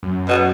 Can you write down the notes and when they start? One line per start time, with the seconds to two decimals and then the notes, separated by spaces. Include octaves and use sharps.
0.03 F#2
0.28 B2